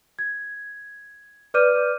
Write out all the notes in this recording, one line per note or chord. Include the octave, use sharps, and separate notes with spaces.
G#6
B4 D5 D6 F6 G6 D#7